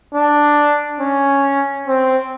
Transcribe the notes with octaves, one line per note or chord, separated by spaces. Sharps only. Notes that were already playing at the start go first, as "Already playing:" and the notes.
D4
C#4
C4